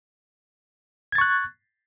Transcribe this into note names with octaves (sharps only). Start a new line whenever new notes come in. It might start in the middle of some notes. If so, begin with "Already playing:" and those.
C#6 F#6 G#6 A6